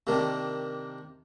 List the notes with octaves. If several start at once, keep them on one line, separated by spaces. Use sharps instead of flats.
C3 D#3 A#3 D4